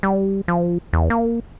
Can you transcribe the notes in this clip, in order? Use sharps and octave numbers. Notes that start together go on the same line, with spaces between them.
G3
F3
E2
A#3